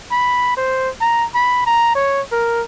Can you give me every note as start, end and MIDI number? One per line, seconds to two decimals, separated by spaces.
0.11 0.53 83
0.57 0.89 72
1.01 1.25 82
1.35 1.65 83
1.66 1.91 82
1.95 2.21 73
2.32 2.63 70